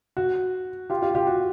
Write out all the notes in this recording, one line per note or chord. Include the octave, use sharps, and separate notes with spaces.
F#4
F4 G4
F4 G4
F4 G4
F#4